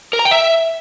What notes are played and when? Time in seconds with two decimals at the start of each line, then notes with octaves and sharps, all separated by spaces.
0.13 A#4
0.19 A#5
0.25 G5
0.31 E5